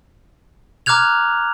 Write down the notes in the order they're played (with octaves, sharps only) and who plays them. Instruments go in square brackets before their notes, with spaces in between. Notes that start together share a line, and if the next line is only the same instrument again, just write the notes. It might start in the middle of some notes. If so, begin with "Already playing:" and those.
[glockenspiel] A#5 D6 F6 F#6 G#6 F7